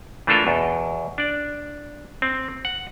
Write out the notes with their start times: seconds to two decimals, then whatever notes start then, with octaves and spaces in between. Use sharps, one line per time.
0.27 E3 A3 D4 F4 A4 A#4
0.47 E2 B2
1.18 D4 D5
2.22 C4
2.65 F#5